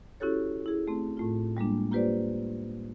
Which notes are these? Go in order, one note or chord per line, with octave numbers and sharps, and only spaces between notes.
C#4 E4 F#4 G4 A4 C#5
E4 G#4
A3 C4
A2 A3 F4
G3 G#3 A#3 D4
A#3 F4 G4 B4 C5 D5